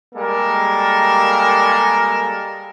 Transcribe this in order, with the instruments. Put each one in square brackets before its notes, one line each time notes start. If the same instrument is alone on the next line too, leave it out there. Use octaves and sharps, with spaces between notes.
[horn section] G3 G#3 A#3 A4 A#4